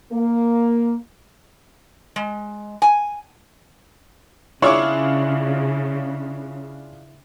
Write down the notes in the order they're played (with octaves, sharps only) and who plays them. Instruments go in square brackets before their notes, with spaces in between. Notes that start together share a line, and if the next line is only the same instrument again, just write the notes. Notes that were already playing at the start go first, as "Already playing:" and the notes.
[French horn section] A#3
[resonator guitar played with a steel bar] G#3
G#5
[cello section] C#3 [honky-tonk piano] D4 F4 G#4 [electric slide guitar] E4 [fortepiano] C#5 C#6 D6